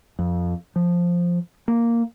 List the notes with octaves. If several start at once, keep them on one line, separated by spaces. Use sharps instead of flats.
F2
F3
A#3